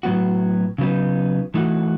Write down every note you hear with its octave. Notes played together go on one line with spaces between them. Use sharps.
A2 F#3 B3 F#4
C#3 F#3 B3 D#4
E3 A3 D#4 F#4